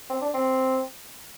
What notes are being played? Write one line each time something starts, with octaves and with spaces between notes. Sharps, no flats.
C4
D4
C4